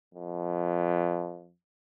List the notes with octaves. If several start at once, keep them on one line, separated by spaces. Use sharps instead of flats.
F2